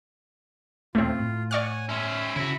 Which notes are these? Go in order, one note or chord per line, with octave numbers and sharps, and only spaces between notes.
D#1 A3 C4 F4
A2
C#5 D5 F#5 G#5 C#6 F6
C#4 C5 E5 B5
C#3 E4 F#4